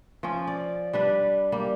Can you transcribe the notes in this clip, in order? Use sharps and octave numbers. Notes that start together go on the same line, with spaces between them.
F3 C#4
D5
G3 D4 B4
G3 A#3